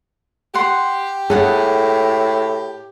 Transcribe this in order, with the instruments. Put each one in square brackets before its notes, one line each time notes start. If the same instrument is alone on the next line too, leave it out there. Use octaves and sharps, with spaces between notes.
[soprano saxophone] G4 [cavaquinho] F#5 C6
[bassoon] A2 [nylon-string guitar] G#4 [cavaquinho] A4 F#5 G#5